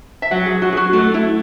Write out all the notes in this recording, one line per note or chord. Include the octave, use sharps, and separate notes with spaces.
E5
F#3 F#5
G#4
F#3 F#4
G#4
F#4
A3 F#4
E4